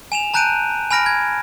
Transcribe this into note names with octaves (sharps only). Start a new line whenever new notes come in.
G#5 E7 F7
A5 A#5 F#6 G6 D7 D#7
G#5 B5 F6 A#6 D7
G#6